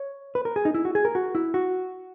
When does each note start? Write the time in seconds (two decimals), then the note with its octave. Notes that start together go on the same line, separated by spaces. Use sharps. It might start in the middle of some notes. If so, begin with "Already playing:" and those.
Already playing: C#5
0.35 B4
0.45 A#4
0.56 G#4
0.65 D#4
0.74 E4
0.85 F#4
0.95 G#4
1.05 A#4
1.15 F#4
1.35 E4
1.54 F#4